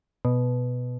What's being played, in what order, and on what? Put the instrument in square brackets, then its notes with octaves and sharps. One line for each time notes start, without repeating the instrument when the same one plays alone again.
[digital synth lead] B2